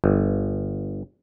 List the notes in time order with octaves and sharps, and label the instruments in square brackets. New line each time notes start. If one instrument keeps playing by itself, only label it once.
[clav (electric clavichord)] G1